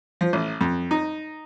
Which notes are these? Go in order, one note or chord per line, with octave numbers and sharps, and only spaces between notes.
F3
A1
F2
D#4